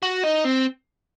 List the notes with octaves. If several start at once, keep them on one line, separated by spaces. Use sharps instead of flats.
F#4
D#4
C4